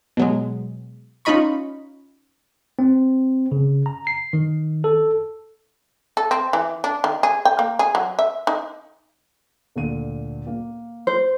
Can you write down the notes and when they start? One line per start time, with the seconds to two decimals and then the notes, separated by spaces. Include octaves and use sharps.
0.17 B2 F#3 G#3
1.25 C#4 D#4 F4 D#5 B5 C#6
2.79 C4
3.52 C#3
3.86 A#5
4.07 C7
4.33 D#3
4.84 A4
6.17 A4
6.31 C4
6.53 E3
6.84 D4
7.04 D#3
7.23 G#4
7.45 G5
7.59 A#3
7.79 G#4
7.95 F#3
8.19 E5
8.47 D#4
9.76 D2 A#2 D#7
10.47 A#3
11.07 C5